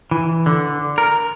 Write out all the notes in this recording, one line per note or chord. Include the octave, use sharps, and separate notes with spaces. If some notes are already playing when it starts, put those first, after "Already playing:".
E3
D3
A#4